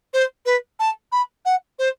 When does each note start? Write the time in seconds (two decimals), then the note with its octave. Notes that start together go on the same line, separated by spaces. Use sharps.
0.13 C5
0.46 B4
0.79 A5
1.12 B5
1.45 F#5
1.79 C5